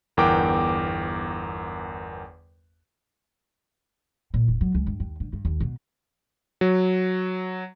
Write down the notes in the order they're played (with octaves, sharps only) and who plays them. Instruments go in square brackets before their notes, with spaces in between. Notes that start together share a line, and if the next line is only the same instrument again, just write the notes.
[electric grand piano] G1 E2 A#4 F#5 G5 D6
[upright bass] A#2
E1
F#3
C#2
G2
D#2
D3
G2
D#2
B2
[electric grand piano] F#3